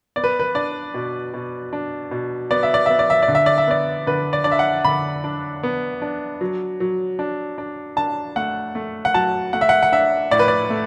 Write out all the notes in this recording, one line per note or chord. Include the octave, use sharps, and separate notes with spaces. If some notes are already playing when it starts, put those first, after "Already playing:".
B3 D5
B4
B4
D4 D5
B2
B2
D4
B2
B3 D5
E5
D5
B3 E5
D5
E5
D5
D3
E5
D5
E5
B3 D5
D3 B4
D5
D4 D5
E5
F#5
D3 B5
D4
B3
D4
F#3
F#3
D4
D4
D4 A5
A3 F#5
A3
F#5
F#3 A5
A3 F#5
E5
F#5
F#5
D4 E5
A2 D5
B4
D5
A3